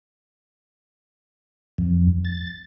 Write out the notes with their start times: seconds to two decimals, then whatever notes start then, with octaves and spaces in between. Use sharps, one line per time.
1.78 F2
2.25 A6